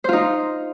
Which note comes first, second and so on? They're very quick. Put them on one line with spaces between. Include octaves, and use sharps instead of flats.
C5 F4 D#4